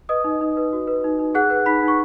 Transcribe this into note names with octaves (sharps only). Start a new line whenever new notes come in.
B4 D#5 D#6
D#4
D#4
B4
F#4
B4
D#4
D#4
G#4 F#5 F#6
B4
D#4 B5 B6
D#4
C#6